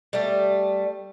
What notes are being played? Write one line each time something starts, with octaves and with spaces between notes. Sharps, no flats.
G3 A3